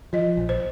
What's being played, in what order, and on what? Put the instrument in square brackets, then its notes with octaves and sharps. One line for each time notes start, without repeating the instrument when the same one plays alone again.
[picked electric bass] F3 [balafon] D#5
[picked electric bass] A#1
[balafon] C5